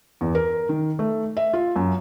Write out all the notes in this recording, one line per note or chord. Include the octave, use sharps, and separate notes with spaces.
E2
A#4
D#3
A3
E5
F4
F#2